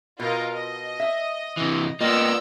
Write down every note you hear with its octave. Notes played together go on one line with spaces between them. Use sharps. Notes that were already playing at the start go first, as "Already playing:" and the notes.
B2 F4 A#4 D#5
D#5
E5
C3 E3
A#3 B3 F4 D5 D#5 G5 E6